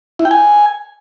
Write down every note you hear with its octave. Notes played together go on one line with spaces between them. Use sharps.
E4
G5
G#5